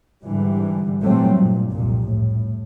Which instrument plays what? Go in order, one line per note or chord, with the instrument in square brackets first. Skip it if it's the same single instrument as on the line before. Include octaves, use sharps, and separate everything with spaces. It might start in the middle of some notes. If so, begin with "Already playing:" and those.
[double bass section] G#2 D3 E3 G3
A#2 E3 F#3 G3 A3 C4
G2 A#2
C2 F2 A#2
A2